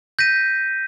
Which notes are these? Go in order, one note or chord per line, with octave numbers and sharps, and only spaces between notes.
G6 A#6 B6 D#7